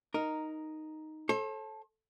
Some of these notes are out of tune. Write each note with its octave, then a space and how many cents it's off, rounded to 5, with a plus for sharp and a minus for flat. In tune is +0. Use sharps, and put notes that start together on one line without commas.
D#4 +0 A#4 +0
A4 -10 C5 +45